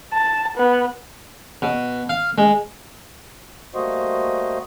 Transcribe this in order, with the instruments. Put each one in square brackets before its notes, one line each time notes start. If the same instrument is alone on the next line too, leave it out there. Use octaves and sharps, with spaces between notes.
[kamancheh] A5
B3
[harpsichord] B2
F5
G#3
[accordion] G3 A3 A#3 F#4 C5 D#5